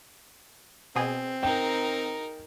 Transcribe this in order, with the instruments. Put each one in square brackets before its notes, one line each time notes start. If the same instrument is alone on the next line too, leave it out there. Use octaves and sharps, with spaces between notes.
[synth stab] B2 G#4 [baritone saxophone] C4
[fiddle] D#4 A#4 [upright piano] G5